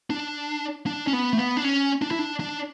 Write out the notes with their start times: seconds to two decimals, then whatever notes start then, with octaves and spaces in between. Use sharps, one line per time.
0.10 D4
0.86 D4
1.07 C#4
1.13 B3
1.33 A3
1.38 B3
1.57 D4
1.64 C#4
2.02 D4
2.11 E4
2.19 D4
2.40 D4